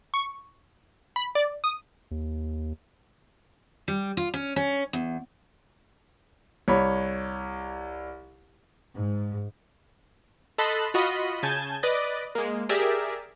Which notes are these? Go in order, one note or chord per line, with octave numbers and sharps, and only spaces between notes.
C#6
B5
D5
D#6
D#2
G3
F4
C#4
C#4
E2
C2 C#5 B5
G#2
A4 D#5 A5 B5 C6 F#6
F4 F#4 D#5 B5 D#7
C#3 G#5 A5 G6 G#6
B4 D5 D#5
G#3 A#3
G4 G#4 A#4 D5 E5